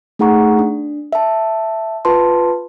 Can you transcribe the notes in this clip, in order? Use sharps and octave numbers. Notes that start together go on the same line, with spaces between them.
A3 D#4 G#4 F#5 A#5 C#6
D4
E5 A5
F4 B4 A5 C6